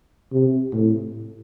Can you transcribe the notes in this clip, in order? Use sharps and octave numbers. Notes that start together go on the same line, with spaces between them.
C3
A2